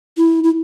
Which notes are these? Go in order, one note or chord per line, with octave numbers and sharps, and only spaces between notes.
E4
E4